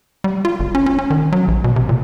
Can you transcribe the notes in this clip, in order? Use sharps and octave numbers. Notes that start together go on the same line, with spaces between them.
G3
F4
G1
C#4
C#4
C#4
D#3
F#3
A#1
B2
C3
A#2